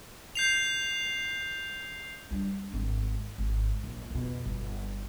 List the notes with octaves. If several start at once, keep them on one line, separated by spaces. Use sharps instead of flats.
G6 C7 F7
G3 D4
G#1
G#1
A#1
F2 B2
G1